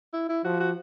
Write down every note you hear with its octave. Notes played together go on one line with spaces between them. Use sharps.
E4
E4
F3 F#4
F#4